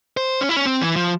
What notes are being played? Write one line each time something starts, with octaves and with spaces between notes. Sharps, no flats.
C5
C#4
E4
C#4
C4
E3
F3